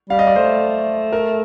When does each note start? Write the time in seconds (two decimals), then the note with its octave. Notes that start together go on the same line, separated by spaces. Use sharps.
0.10 G3 F5
0.19 D#5
0.27 D5
0.36 A3 C5
1.13 A#4